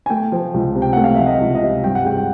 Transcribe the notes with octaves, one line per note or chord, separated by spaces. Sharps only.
G#5
A3 G5
F3
C#2
C3
G5
A3 F#5
F5
F3 E5
D#5
C#2
D#5
C3
G2 G5
F#5
G#3 G5
G5